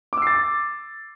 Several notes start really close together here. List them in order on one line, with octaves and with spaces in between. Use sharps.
D6 E6 C7 A6